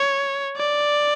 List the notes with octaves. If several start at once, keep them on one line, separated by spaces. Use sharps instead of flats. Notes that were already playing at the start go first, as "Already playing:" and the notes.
Already playing: C#5
D5